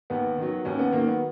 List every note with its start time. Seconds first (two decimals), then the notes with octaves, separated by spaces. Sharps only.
0.10 D#2 B3
0.38 D#3 F#3
0.65 D#2 C#4
0.79 B3
0.93 D#3 F#3 A#3
1.07 B3